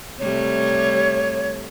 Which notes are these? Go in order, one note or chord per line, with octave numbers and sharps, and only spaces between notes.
C3 G3 A3 C#5